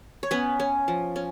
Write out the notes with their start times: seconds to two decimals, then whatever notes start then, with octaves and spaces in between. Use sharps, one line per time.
0.23 C#5
0.31 B3 C#4 B4
0.60 C#4
0.88 F3
1.16 C#4